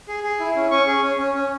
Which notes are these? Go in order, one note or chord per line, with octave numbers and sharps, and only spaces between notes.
G#4
G#4
E4
C#4
C#4 C#6
G#4
C#4
C#4
C#4